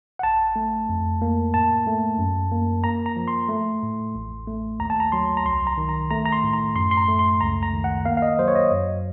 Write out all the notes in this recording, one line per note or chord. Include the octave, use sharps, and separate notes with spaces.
F#5
A1 A5
A3
F2
A#3
A2 A5
A3
F#2
A#3
A#3 A#5
A#5
F3
C6
A3
A2
A1
A3
D#2 A#5
A5
A#5
F#3 C6
A#5
C2 C6
A#5
D#3
A#5
A3 A#5
A#5
C6
A2
A#5
F#2 C6
C6
A#5
A3
C6
C#2 A#5
A#5
D#3
F#5
A#3 F5
F5
D#5
F#3 C5
C#5
D#5
F#2